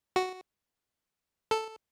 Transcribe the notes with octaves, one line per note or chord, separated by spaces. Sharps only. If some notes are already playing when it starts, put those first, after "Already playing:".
F#4
A4